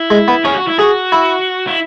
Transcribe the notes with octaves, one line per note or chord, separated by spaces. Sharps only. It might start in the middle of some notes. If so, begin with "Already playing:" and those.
Already playing: E4
G#3
B3
C#4 G#4
F#4
E4
F#4 G#4
E4
E4